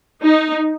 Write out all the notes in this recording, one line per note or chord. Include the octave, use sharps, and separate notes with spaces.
D#4